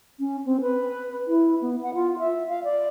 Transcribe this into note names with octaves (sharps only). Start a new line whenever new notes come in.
C#4
C4
B4
E4
B3
F#5
F4
E5
F5
D5